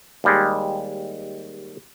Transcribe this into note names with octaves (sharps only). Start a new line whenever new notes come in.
D#2 G3 G#3